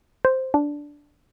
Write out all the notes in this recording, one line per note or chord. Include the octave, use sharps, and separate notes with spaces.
C5
D4